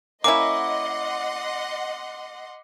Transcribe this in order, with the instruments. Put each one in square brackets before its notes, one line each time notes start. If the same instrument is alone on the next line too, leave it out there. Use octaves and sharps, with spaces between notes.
[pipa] A#3 C#4 E4 [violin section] D#5 F#5 C6 [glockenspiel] D6